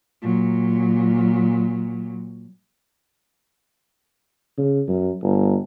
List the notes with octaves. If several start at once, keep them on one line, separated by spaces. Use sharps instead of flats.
A#2 F#3
C#3
F#2
G1